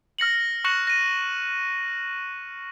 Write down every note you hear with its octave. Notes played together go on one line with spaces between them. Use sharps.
F6 A#6 C#7 F#7
C#6 F#6 A#6 C#7 E7 F#7
A#6 D#7